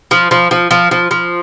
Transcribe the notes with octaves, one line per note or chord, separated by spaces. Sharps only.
F3
F3
F3
F3
F3
F3